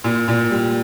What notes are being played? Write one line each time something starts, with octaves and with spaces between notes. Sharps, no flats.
A#2
A#2
G3